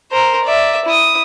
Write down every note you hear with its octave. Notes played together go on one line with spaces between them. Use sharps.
A#4 C5
D5 E5
E4 D#6